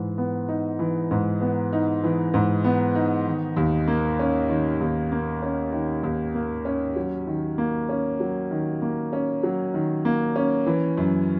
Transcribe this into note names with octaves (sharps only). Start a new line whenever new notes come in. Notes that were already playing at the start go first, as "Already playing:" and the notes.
Already playing: G#2 E3
B3
D#4
E3
G#2
B3
D#4
E3
G#2
B3
D#4
D#3
D#2
A#3
C#4
D#3
D#2
A#3
C#4
D#3
D#2
A#3
C#4
F#3
D#3
A#3
C#4
F#3
D#3
A#3
C#4
F#3
D#3
A#3
C#4
E3
F#2